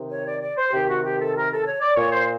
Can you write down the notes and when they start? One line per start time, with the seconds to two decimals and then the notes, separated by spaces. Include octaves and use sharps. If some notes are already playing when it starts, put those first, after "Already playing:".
Already playing: C3 D#3
0.09 C#5
0.24 D5
0.39 D5
0.56 C5
0.71 C3 D#3 G4
0.87 F#4
1.02 G4
1.18 A4
1.33 A#4
1.49 A4
1.65 C#5
1.81 D5
1.96 A#2 C#5
2.12 C5